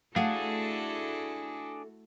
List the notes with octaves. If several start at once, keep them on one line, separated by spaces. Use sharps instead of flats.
A3 D4 E4 F#4 G#4 A4 F5 F#5